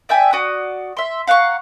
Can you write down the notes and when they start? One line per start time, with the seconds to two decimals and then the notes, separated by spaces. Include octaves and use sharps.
0.09 D5 E5 G5 G#5
0.33 F#4 D5 D#6
0.97 E5 C6
1.27 F5 F#5 A#5 C#6